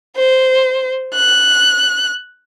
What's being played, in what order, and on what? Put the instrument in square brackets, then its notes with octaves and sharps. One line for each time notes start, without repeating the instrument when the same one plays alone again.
[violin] C5
F#6